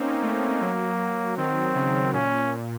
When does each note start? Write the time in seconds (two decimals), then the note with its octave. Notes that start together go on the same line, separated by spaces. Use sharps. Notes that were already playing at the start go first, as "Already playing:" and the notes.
Already playing: A#3 C4 C#4 D#4
0.22 A3
0.61 F#3
1.37 D#3 C4
1.75 C#3
2.13 A#2 C#4